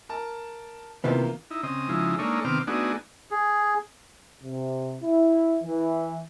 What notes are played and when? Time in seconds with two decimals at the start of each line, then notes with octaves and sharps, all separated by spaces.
0.09 A#4 A5
1.04 C3 D#3 E3 A#3 B3 F4
1.50 D#4 E4
1.63 C#3 C4 D#5
1.89 C#3 F3 G#3 D#4 E4
2.19 G#3 A#3 D4 D#4 A4 C#5
2.44 C3 D#3 B3 C4 D6 F6
2.67 A3 B3 D4 D#4 F#4 G#4
3.31 G#4
4.43 C3
5.02 E4
5.63 E3